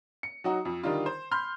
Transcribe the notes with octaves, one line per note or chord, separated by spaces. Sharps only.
C#7
F#3 D#4 F#4
F2
D3 D#3 G3 D#4 F4
C5
B5 C6 F6 G6